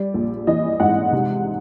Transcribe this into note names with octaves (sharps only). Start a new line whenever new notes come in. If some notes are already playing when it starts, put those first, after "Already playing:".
Already playing: G3 D5
A#1
E3 D#5
G#2 F#5
C3